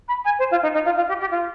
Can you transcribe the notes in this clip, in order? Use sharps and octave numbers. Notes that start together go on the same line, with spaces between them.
B5
G#5
C5
F4
D#4
D#4
F4
F4
G4
G4
F4